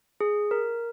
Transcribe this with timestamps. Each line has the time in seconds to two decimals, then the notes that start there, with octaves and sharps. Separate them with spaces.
0.21 G#4
0.51 A#4